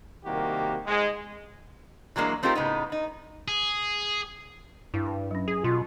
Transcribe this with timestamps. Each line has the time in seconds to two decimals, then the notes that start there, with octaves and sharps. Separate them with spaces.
0.24 C2 D#3 A#3 F#4 G4
0.86 G#2 G#3
2.16 E3 F#3 G#3 A#3 D4
2.43 A3 C4 D#4 F4 G4 A#4
2.55 A2 C#3 B3 D#4
2.92 D#4
3.48 G#4
4.94 G2 E4
5.06 B4
5.31 F#3 C#4
5.48 G#4
5.64 B2 F4